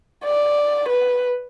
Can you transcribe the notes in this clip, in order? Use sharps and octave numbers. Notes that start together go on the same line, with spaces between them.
D5
B4